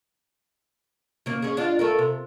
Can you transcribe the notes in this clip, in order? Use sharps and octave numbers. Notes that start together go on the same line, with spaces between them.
C#3 A#3
C#4 G#4
D4 F4
A3 A4 A#4
C3